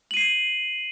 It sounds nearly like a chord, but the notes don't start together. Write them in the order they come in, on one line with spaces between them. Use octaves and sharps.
F#7 D#7 C7